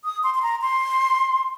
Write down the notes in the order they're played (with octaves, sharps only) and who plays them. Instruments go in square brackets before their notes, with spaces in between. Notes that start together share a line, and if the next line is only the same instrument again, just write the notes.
[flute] D#6
C6
C6
A#5
C6